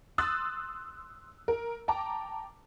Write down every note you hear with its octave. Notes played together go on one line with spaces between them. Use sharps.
C6 D#6 E6 F#6 A6
A#4
G5 A5 A#5 D6